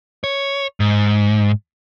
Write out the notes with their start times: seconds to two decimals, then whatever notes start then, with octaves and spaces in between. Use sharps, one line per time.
0.24 C#5
0.80 G#2